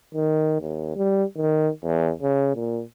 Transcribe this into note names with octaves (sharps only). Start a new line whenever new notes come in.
D#3
D#2
G3
D#3
E2
C#3
A#2